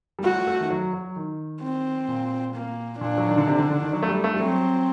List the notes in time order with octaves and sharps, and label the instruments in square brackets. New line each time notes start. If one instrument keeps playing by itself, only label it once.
[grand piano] G3
[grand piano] A3 [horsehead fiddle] F#4
[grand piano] A3
D#3
F#3
F#3
D#3
[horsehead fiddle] C4
[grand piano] A#2
[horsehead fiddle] A#3
[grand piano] A#2 [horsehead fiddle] D4
[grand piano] F#3
D#3
D3
C3
D3
D3
D#3
F#3
A3
G3
A3
G3
[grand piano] F#3 [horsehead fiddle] C4